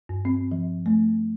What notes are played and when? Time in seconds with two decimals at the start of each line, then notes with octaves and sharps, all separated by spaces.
0.09 G2
0.25 C4
0.52 F3
0.86 A3